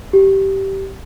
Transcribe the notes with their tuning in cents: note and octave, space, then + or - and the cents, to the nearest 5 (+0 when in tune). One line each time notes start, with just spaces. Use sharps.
G4 -15